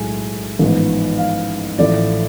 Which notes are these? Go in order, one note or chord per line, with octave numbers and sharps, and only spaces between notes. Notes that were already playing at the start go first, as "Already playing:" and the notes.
Already playing: B1 A2 G#3 G#5
A1 G#2 F3 B3
F5
A1 A2 F3 A3 D5